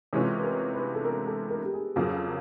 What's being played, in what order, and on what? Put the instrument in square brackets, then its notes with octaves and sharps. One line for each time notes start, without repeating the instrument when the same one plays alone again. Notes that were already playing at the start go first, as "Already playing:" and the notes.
[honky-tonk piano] C3 E3 G#3 C#4 F4 [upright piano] A4
[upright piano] B4
A#4
B4
A4
A#4
A4
A#4
G4
G#4
[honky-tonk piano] F2 C#3 F#3 A#3 [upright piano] G#4